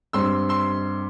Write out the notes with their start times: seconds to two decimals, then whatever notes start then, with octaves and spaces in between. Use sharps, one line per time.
0.13 G2 G3 C4 C6 E6
0.49 C6 E6